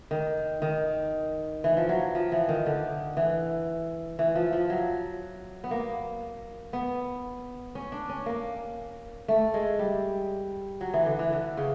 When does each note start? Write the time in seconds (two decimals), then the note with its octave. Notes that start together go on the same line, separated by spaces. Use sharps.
0.11 D#3
0.62 D#3
1.64 E3
1.77 F3
1.89 F#3
2.15 F3
2.32 E3
2.49 D#3
2.66 D3
3.17 E3
4.19 E3
4.35 F3
4.53 F3
4.70 F#3
5.64 B3
5.71 A#3
6.73 B3
7.75 C#4
7.92 D4
8.09 C#4
8.26 A#3
9.28 A3
9.54 G#3
9.79 G3
10.81 F#3
10.94 E3
11.06 D3
11.19 E3
11.32 D3
11.57 C#3